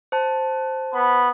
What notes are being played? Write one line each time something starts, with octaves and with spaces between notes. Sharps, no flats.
C5 A5
B3 B5